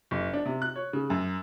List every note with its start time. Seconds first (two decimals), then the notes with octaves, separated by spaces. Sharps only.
0.11 F#1
0.33 D4
0.45 C3
0.62 F#6
0.76 C#5
0.93 C#3
1.10 F#2